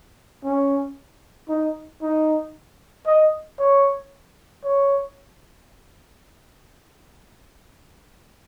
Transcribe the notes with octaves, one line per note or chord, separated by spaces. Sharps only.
C#4
D#4
D#4
D#5
C#5
C#5